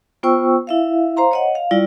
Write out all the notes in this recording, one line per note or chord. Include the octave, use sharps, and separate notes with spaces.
B3 F4 C5 G5 C#6 E6
E4 E5 F5
C5 F5 A#5 C6
C#5 D#5 F#5
F5
G3 E4 F4 D5